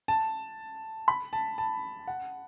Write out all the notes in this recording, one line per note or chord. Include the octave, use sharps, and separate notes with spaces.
A5
B5
A5
A5
F#5